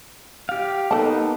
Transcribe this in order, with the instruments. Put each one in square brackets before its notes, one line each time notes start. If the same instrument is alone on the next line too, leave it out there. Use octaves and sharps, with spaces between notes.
[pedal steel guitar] G4 F5
[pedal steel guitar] A#3 B3 D#4 [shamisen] A4 A5